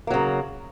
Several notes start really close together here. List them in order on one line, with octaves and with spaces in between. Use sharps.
A#3 F#3 C#3